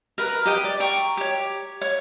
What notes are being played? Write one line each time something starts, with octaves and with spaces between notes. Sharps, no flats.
A#4 B4 A#5
G4 D#5 G5
D5
G5 A#5 C#6
G4 C#5
C#5